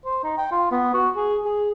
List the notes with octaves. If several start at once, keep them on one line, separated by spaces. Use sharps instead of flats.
C5
D#4
G5
F4
B3
F#4
G#4
G#4